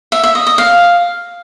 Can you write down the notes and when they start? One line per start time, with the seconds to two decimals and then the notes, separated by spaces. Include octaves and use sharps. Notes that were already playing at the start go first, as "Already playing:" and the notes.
0.12 E5
0.24 E5
0.35 D#5
0.47 D#5
0.58 F5